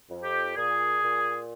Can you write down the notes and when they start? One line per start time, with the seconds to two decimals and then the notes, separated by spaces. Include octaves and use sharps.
0.10 F2
0.25 G4
0.56 A#2 G#4
1.03 A#2